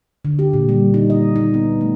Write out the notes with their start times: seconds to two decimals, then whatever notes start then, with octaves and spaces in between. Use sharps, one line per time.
0.25 D3
0.39 G4
0.53 A#2
0.69 G3
0.94 D#4
1.10 D#5
1.36 D#4
1.54 B3
1.81 A3